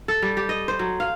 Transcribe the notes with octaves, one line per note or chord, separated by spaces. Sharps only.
A4
G3
G4
D#5
C5
F#3
F5